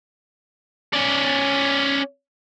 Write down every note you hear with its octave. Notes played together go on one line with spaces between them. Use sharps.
C#4 D5